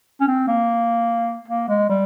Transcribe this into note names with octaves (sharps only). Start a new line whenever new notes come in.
C#4
C4
A#3
A#3
G#3
G3